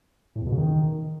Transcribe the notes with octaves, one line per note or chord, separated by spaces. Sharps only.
A2
E2
B2
C#3
D#3